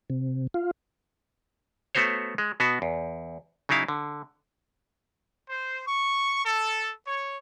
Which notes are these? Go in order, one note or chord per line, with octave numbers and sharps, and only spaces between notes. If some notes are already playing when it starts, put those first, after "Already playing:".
C3
F4
A3 B3 F#4 C5 C#5
G#3
B2 B3 F#4
E2
C#3 F#3 D#4 E4 F5
D3
C5
C#6
A4
C#5